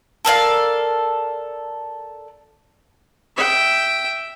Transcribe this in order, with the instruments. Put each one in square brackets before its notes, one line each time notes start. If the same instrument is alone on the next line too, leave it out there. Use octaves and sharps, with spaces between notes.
[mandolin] A4 A#4 D5 F5
[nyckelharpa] E5 G5